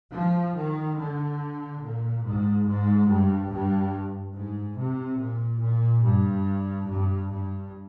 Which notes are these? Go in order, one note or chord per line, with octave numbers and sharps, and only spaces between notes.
F3
D#3
D3
A#2
G#2
G#2
G2
G2
G#2
C3
A#2
A#2
G2
G2
G2